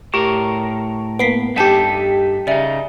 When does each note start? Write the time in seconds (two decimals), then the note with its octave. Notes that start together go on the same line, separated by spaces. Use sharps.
0.14 A2 G4 A#4 C#6
1.19 A#3 B3 B6 C7 D7
1.56 G2 D#4 G4 A4 F#5 A5 G6 B6
2.47 C#3 D#4 D5 E5